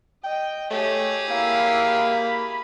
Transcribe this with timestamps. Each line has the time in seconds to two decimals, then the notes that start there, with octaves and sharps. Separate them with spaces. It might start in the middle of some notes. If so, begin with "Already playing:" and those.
0.24 D#5 G5
0.71 A3 G4 G#4 C#5
1.31 A#3 E4 F5
1.97 B5